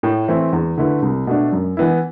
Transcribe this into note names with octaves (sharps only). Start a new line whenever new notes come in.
A2
E3 A3 C4 E4
E2
D3 A3 E4 B4
C2
B2 A3 D4
F#2
E3 B3 E4